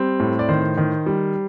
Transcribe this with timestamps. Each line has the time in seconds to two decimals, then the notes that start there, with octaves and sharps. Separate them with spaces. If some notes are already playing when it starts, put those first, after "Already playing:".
Already playing: G3 C4
0.20 A2
0.39 D5
0.49 D#3 C5
0.77 D#3
1.06 G3